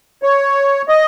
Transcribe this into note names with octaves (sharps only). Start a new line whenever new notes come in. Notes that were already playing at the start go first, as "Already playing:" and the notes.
C#5
D#5